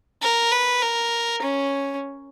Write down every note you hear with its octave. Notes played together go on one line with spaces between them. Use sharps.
A#4
B4
A#4
C#4